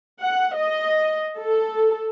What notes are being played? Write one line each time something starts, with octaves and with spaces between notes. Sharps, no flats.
F#5
D#5
A4